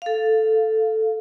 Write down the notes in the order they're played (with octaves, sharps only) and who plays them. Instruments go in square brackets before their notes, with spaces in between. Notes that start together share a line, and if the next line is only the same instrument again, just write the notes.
[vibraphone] A4 F5